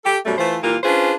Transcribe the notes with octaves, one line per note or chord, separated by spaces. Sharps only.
G4 A4
F#2 B2 F#3 G3 A3
E3 A3 F4 B4 C5
A#2 E3 G3 A#3 F4 A#4
C#4 D4 F4 G#4 B4 C5